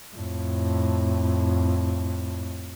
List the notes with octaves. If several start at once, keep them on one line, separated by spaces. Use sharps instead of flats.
F2 A2